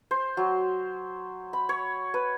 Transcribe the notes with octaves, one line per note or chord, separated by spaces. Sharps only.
C5
F#3
B5
C#5
B4